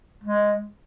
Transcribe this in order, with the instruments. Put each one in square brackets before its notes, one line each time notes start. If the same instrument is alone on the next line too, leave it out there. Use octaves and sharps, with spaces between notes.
[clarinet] G#3